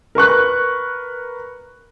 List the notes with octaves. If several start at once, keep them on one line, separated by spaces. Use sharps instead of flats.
A#4 B4 C#6 F#6